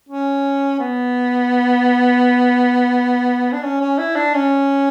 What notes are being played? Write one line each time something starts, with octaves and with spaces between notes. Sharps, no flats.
C#4
B3
D4
C#4
C#4
E4
D4
C#4